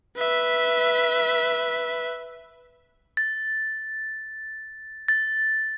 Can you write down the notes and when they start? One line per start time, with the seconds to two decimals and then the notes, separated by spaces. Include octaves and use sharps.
0.17 B4 E5
3.17 A6
5.08 A6